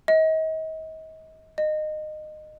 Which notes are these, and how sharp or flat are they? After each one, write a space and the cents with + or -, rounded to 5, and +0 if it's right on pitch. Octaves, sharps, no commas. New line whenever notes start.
D#5 +35
D#5 -20